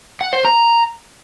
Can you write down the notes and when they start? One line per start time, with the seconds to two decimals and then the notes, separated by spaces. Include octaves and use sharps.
0.21 F#5
0.33 C5
0.45 A#5